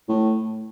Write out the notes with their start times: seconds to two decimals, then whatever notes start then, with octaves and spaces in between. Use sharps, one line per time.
0.09 A2